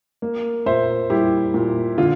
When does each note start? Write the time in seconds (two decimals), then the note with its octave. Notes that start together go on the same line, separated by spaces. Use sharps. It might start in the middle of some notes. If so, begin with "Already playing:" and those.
0.22 A#3
0.66 A#2 C5 E5
1.10 G3 E4 G4
1.54 A#2
1.98 D3 F4